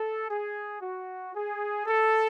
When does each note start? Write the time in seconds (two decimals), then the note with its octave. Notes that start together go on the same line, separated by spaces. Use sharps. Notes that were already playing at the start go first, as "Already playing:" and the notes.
Already playing: A4
0.29 G#4
0.81 F#4
1.34 G#4
1.86 A4